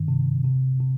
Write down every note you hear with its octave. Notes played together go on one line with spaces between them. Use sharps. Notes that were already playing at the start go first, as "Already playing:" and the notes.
Already playing: G2 D#3
C3
C3
C3